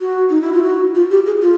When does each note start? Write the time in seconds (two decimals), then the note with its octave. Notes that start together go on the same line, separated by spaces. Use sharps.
0.01 F#4
0.30 D#4
0.41 E4
0.53 F4
0.63 F#4
0.95 F4
1.11 G4
1.26 G#4
1.41 F4